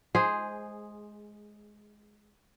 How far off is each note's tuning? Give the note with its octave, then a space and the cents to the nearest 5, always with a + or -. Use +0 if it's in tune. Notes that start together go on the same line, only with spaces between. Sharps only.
G#3 +15 G#4 -5 C5 +0